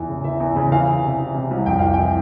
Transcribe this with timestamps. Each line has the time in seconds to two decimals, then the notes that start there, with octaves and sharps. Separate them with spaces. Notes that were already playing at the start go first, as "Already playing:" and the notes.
Already playing: E2 E3
0.09 C#3
0.24 E3 E5
0.40 E2
0.56 C#3
0.72 E3 F5
0.88 E3
1.04 C3
1.19 E3
1.34 C3
1.51 C2
1.66 F2 G5
1.79 E3 F5
1.94 E3 G5